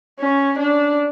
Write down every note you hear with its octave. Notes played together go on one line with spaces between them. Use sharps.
C#4
D4